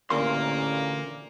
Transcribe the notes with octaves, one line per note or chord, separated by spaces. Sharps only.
A1 D2 A#2 A#3 C6